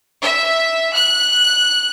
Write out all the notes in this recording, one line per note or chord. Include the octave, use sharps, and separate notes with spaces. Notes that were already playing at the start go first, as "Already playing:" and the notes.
E5
F#6